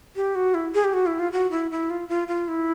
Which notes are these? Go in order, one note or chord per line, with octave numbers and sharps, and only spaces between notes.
G4
F#4
E4
G#4
G4
F#4
E4
F4
F#4
E4
E4
F4
F4
F4
E4